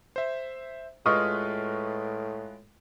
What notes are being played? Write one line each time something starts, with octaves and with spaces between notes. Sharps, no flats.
C5 E5
A2 G#3 F4 B4 D#5 C#6 D#6 F6